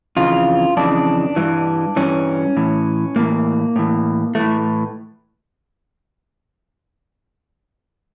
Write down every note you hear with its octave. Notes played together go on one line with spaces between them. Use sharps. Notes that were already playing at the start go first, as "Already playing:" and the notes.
F2 C#3 E3 F4
F2 C#3 E3 D4
G2 E3
G2 E3 C#4
A2 E3
A2 E3 A#3
A2 E3
A2 E3 A3